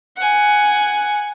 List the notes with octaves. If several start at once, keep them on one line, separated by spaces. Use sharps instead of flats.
F#5 G#5